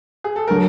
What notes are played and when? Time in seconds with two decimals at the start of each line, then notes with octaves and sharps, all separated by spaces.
0.24 G#4
0.36 A4
0.48 D3 F#3 A#4